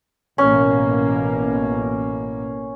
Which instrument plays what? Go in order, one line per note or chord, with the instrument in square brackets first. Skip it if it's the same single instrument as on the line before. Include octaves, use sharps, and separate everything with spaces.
[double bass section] A1 B2 A#3 [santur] C#4